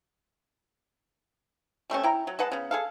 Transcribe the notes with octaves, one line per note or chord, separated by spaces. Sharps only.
G3 A3 C4 C#4
E4 G5 A#5
F#3
G#3 B4 F#5 A5
C#3 B3
G#4 A4 F5